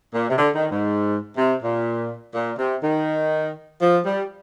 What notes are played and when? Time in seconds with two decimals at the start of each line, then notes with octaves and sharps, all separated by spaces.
0.14 A#2
0.29 C3
0.38 D3
0.55 D#3
0.71 G#2
1.37 C3
1.61 A#2
2.34 A#2
2.58 C3
2.83 D#3
3.81 F3
4.05 G3